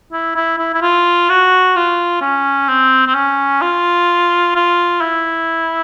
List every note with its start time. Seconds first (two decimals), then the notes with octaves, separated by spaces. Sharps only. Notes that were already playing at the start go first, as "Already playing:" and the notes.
0.13 E4
0.36 E4
0.58 E4
0.74 E4
0.82 F4
1.29 F#4
1.76 F4
2.21 C#4
2.69 C4
3.07 C4
3.15 C#4
3.62 F4
4.55 F4
5.01 E4